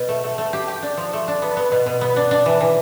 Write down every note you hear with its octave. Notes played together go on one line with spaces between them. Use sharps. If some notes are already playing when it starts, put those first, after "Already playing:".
Already playing: B2 B3
A3
A3
A3
G4
G4
D4
F3
A3
D4
B3
B3
B2
B2
B3
D4
D4
E3
E3